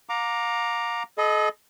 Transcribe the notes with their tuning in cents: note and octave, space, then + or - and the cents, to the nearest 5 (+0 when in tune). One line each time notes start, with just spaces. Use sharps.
F5 +35 A#5 +0 D6 +0
A4 -40 D#5 +0 B5 +10